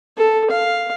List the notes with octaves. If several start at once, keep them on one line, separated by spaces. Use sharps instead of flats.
A4
F5